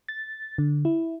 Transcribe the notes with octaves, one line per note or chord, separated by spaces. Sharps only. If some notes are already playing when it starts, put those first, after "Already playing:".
A6
D3
E4